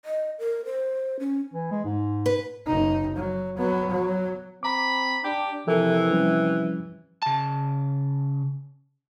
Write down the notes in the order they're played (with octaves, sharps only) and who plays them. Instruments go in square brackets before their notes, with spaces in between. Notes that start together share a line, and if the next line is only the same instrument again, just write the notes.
[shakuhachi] D#5
A#4
C5
C#4
[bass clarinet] E3
G#3
G#2
[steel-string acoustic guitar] B4
[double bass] F#1 D#4
F#3
F#3 B3
F#3
[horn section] C4 B5 [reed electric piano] A#5 D6
[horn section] D4 G4
[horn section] C3 E3 [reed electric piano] F3 A4 A#4
[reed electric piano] F3 G3 C#4
[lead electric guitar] C#3 A5